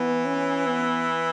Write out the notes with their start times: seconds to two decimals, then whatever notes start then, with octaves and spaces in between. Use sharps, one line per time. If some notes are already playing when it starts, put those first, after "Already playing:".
Already playing: E3 B3
0.25 C#4
0.67 B3